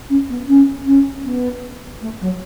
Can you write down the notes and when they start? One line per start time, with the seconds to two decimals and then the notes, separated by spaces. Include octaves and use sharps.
0.09 C#4
0.29 B3
0.48 C#4
0.86 C#4
1.24 B3
2.01 A3
2.21 F#3